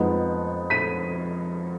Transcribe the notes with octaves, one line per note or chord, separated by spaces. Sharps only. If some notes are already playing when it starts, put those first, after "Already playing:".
Already playing: F2 F3 G#3 B3 D#4
B6 D#7